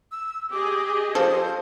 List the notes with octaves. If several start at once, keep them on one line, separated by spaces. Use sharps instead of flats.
E6
G4 G#4 D#5 D6
F3 A4 C5